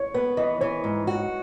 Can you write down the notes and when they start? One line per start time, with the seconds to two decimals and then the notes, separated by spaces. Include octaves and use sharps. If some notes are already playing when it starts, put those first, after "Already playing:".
Already playing: C#5
0.14 B3 B4
0.37 E3 D#5
0.61 E3 C#5
0.84 G#2
1.07 F#4